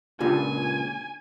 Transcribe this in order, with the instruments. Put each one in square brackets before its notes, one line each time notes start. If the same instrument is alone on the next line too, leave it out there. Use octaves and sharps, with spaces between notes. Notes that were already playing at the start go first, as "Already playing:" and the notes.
[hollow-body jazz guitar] C#2 A#2 [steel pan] D4 F4 G4 [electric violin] G#5